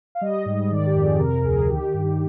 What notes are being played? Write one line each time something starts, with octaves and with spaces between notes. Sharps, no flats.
F5
G3 D#5
G#2
D#3 D5
G4
F2
G#4
C3 A#4
D2 G#4
G#4
D#3 G4
G2